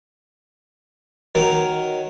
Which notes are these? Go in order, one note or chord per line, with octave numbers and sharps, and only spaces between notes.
D#3 F#3 A#4